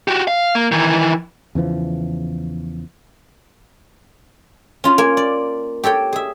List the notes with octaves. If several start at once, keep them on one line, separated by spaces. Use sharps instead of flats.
F#4 G4
F5
A#3
D#3 E3
E2 C#3 E3 F3
C#4 F4
A#3 G#5
D5
G4 A4 C#5 G5
G#4 E5